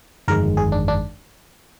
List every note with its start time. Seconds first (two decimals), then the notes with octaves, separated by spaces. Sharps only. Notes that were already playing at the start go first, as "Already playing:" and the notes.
0.28 G1 F2 D#3 G#3 A#4
0.57 G#4
0.72 D4
0.88 D4